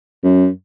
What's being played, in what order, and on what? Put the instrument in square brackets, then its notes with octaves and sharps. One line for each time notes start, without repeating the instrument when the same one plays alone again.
[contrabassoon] F#2